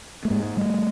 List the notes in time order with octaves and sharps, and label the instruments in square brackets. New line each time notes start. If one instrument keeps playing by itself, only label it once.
[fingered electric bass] A3
G#2 G#3 A#3
G3 A3